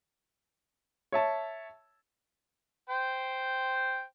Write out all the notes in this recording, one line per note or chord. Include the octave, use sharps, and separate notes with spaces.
C#5 E5 A5
C5 G5